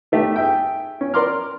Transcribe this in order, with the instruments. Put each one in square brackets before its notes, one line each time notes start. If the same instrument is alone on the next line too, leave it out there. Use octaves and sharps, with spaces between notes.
[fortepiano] D#3 A3 G4
G#4 E5 G5
C#4
A#4 D5 A#5 C6 D6 F6